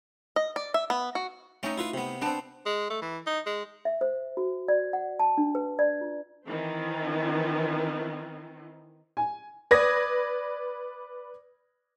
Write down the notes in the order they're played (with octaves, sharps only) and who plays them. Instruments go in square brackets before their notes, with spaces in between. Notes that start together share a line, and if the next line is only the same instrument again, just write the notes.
[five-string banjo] D#5
D5
E5
B3
F#4
[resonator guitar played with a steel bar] A3 D#4 [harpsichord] C#4 G5
[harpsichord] E4 F4 B4
C3 B3
[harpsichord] B3 C4 [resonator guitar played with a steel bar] D4 G5 A5
[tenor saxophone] G#3
A3
E3
D#4
G#3
[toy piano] E5
C5
F#4
D5
F#5
A5
D4
B4
D5
F4
[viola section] D#3 E3 C4
[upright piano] G#5
[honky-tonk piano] B4 D5 D#6 G#6 A#6